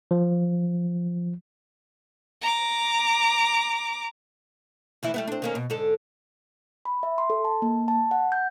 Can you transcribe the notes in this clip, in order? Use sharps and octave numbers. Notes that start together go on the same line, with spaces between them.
F3
A#5 D6
D2 E3 E4
G3 A3 B3
C4 D4
D#3 A#3 C#4
B2
G#2 D3 A4
B5
E5
C6
A4
A5
A#3
A5
F#5
G6